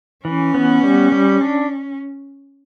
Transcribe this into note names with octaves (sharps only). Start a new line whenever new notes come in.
E3 C#4
B3
G3
G3
D4